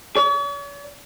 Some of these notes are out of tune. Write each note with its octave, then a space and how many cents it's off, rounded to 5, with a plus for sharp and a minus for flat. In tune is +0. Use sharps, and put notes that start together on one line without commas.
C#5 +45